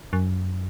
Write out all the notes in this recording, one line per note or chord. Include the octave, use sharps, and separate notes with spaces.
F#2